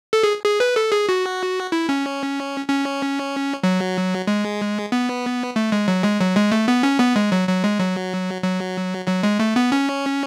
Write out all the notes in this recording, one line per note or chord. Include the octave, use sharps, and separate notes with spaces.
A4
G#4
G#4
B4
A4
G#4
F#4
E4
C#4
C#4
F#3
G#3
B3
A3
G#3
F#3
G#3
F#3
G#3
A3
B3
C#4
B3
G#3
F#3
F#3
G#3
F#3
F#3
F#3
G#3
A3
B3
C#4